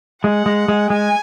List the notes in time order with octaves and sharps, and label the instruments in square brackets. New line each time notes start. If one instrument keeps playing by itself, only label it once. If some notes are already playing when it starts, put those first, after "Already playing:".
[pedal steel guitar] G#3 [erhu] F#5
[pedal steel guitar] G#3
G#3
[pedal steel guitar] G#3 [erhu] G#5